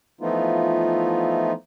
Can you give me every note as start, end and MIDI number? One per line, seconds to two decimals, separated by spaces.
0.21 1.53 52
0.21 1.53 53
0.21 1.53 57
0.21 1.53 59
0.21 1.53 63
0.21 1.53 65